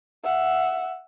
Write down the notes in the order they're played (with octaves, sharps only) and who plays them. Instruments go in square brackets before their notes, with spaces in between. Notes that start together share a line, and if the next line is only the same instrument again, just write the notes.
[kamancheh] E5 F#5